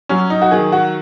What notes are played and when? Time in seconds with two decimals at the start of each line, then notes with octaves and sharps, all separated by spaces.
0.09 F#3 C#4
0.30 D#4
0.42 F#4
0.51 D#3 G#4
0.72 F#4